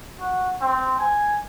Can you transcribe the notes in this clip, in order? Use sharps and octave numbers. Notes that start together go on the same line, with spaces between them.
F#4
C4
G#5